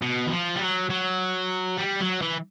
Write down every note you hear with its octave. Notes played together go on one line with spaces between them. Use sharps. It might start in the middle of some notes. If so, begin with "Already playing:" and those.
B2
E3
F3
G3
F#3
F#3
G3
F#3
E3